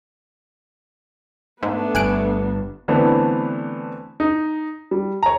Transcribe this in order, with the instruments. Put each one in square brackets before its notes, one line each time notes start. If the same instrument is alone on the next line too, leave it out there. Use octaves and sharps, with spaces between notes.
[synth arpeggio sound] G#2 [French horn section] A3 [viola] B3 D4
[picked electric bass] G1 G2 [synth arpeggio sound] G#5 F#6 D7
[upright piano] D3 E3 A3 B3 C4 D4
D#4
G3
C#5 A#5